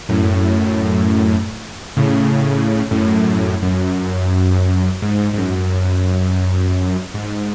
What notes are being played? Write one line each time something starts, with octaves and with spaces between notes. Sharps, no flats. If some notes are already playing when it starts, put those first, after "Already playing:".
F#2 A2
A2 C#3
F#2 A2
F#2
G#2
G#2
F#2
G#2